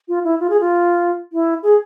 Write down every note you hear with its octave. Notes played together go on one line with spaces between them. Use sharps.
F4
E4
F4
G#4
F4
E4
G#4